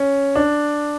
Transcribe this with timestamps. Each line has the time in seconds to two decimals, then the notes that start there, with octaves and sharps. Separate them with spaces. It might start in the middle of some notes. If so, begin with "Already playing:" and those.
Already playing: C#4
0.36 D4